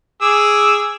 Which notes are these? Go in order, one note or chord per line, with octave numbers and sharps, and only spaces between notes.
G#4 D6 E6